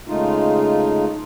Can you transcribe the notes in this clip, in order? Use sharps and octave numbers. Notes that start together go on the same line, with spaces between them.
C#3 G#3 A3 D#4 F4